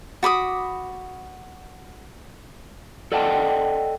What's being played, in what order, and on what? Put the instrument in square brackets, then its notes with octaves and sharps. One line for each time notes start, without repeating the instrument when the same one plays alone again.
[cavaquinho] F#4 B5 D6 D#6
[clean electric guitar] A4 D5 D#5 F#5 G5 A5